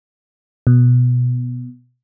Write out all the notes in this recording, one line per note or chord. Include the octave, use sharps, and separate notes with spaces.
B2